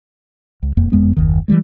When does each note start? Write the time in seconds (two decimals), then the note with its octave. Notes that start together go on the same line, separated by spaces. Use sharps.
0.63 C#2
0.77 E1 F2 A#3
0.92 F#1 F2 G#3 B3
1.17 F#1 D#2 D#3
1.48 E3 F3 G3 G#3